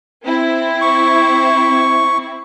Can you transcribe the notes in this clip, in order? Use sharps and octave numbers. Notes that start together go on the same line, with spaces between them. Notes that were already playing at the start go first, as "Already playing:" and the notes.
C4 E4
C#6